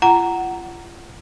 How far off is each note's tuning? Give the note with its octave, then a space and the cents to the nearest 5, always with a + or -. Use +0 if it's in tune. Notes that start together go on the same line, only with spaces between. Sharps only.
F4 -30 F#5 +10 A#5 +0